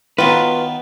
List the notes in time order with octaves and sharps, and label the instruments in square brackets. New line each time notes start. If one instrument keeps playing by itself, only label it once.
[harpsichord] D#3 B3 [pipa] F#3 F4 [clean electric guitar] B4